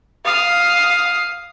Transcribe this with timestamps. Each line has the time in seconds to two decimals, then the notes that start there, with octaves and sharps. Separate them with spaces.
0.25 F5 D#6